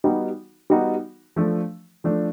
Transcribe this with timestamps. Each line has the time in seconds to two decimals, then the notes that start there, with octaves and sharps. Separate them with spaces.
0.04 G3 B3 D#4 F#4
0.70 G3 B3 D#4 F#4
1.36 F3 A3 D4
2.04 F3 A3 D4